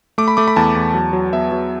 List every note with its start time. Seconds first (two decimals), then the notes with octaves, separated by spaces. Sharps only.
0.18 A3 D6
0.28 B5
0.37 A3 D6
0.48 B5
0.56 E2 A5
0.76 E2
0.94 F#3
1.13 F#3
1.33 B3 E5
1.52 F#3